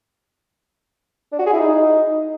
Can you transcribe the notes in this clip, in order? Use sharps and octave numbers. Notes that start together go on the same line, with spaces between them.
D4
F#4
G#4
E4
D#4